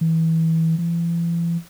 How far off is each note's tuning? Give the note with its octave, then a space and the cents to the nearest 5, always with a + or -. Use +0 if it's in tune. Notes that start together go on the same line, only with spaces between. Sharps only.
E3 -25
E3 +40